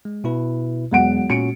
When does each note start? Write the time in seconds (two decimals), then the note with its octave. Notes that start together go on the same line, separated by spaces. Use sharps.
0.05 G#3
0.24 B2 E4 B4
0.91 E1 F#3 F#5 D7
1.30 A#2 C#4 F#4 C#7 D7